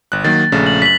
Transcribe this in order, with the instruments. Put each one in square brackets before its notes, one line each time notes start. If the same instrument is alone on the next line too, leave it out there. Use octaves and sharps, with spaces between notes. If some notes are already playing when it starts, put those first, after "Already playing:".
[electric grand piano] G1 F#6
[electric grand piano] D#3 F#3 A#3 [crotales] A6
[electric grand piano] A#1 C#3 A3
[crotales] F#7
[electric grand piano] F#2 [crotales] B6 F#7